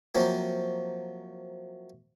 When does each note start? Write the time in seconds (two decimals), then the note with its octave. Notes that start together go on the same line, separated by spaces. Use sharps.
0.15 C3 F3 F#3 A#3